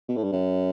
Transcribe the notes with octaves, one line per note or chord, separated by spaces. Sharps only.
B2
A2
G2
F#2